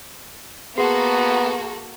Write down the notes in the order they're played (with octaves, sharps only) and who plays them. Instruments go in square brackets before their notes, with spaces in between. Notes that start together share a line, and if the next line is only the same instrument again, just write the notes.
[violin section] A#3 F#4 A4 [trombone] B3 [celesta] G#4 C6 C7